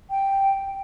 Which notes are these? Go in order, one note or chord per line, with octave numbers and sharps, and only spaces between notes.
G5